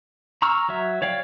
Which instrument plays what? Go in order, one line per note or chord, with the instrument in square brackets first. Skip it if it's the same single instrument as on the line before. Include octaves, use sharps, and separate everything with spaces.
[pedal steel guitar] A#5 C#6 E6 F6
F#3 E5
C#5 D5 F5 G5